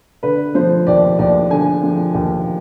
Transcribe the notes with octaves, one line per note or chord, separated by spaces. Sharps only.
D3 B4
F3 C5
D#2 D5
D#2 D5
D3 G#5
F3
D#2